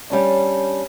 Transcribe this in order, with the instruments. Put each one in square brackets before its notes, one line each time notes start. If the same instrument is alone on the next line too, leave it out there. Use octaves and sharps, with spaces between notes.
[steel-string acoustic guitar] G3 C#4 D4